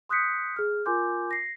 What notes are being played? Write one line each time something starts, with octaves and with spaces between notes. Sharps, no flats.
C6 D#6 F#6 G6 B6 C#7
G#4 F6
F4 A#4 G#5 C6 D6 G6
A#6 C7